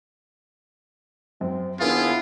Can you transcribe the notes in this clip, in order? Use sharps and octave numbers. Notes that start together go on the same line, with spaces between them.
F#2 C4
D#2 B3 D4 E4 F4 G#4 A#4 F5